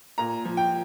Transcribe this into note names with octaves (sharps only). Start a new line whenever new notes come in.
A#2 A#5
F3
G5